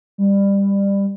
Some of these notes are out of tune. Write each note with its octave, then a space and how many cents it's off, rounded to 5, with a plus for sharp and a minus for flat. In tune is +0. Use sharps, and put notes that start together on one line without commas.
G3 +20